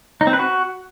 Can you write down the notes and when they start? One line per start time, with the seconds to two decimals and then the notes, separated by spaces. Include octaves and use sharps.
0.21 D#4
0.27 C4
0.33 B4
0.39 F#4